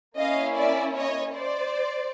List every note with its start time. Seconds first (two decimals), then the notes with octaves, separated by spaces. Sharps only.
0.18 A#3 C#4 E4 D#5 F5
0.56 D5 E5
0.96 C#5 D#5
1.35 C5 D5